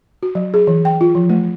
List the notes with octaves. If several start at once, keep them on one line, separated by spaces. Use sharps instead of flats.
F#4
F#3
G#4
E3
G5
F4
F3
A3